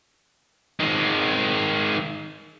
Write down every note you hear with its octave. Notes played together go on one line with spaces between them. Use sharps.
D#3 G#3